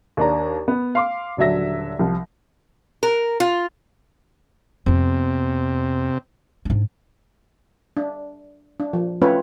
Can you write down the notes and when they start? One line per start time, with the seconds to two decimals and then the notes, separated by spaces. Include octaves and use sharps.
0.17 D#2 D4 A#5
0.68 B3
0.95 F5 C6 D6
1.37 D#1 D3 F#3 D4 E5 A#6
1.99 C2 F3
3.03 A#4
3.40 F4
4.86 F2 C3 B3
6.65 G#2 D4
7.97 D4
8.80 D4
8.93 F3
9.22 A3 C4 C#4 F4 B4 C#5